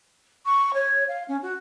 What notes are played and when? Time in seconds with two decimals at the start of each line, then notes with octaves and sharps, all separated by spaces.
0.46 C#6
0.74 C#5
1.08 F5
1.28 C#4
1.42 F#4